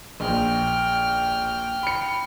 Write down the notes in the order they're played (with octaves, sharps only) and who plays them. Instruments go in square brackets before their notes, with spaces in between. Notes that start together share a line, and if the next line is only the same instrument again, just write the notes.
[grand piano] A#1 [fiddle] G5 F6
[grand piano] B5 C#7